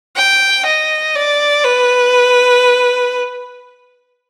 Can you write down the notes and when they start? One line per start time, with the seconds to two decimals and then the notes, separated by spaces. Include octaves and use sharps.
0.16 G5
0.66 D#5
1.15 D5
1.64 B4